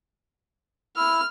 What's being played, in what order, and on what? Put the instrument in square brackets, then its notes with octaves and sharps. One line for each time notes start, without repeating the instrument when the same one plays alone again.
[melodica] E4 E6 [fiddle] F6